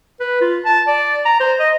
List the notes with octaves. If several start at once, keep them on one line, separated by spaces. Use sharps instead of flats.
B4
F4
A5
D5
A#5
C5
D#5